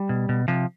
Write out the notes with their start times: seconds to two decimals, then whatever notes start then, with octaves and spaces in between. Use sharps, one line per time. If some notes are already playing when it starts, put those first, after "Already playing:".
Already playing: G3
0.09 B2
0.29 B2
0.48 C3 F3